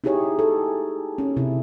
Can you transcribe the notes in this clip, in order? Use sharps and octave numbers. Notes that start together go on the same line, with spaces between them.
D#4 E4 G4 G#4 C#5
A4
C#4
C3 E4